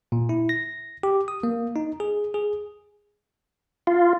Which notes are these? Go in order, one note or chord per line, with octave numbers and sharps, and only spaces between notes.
A#2
E4
A#6
G4
D#6
A#3
D#4
G#4
G#4
F4